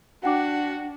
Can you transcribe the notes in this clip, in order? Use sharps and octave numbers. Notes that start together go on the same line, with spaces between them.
D4 F#4 F#5 G5 D6